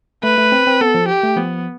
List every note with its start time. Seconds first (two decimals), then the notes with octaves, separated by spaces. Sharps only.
0.23 A3 B4
0.38 A3
0.52 C4
0.67 C4
0.81 B3 A4
0.94 F3
1.08 G4
1.23 A3
1.37 F3 B3